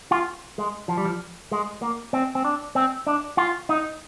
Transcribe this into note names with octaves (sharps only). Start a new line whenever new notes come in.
F4
G#3
F3
G3
F3
G#3
A#3
C4
C4
D4
C4
D4
F4
D#4